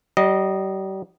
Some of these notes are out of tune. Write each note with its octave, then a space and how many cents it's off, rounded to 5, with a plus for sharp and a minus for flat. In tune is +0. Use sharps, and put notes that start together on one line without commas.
G3 -40 D#5 -10